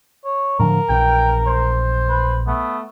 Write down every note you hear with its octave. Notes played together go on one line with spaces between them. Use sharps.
C#5
A2 D3 F3 A#4
A#1 E3 G5
C5
B4
A3 B3